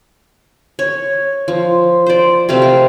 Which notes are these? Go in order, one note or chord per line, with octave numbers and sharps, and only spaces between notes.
C#5
F3
C5 D5
C3 A3 F5 A5
A#4